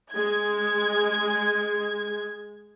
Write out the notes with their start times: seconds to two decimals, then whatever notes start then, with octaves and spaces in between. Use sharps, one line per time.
0.12 G#3 G#6